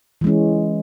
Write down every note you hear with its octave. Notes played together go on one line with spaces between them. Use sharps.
E3 G#3 C#4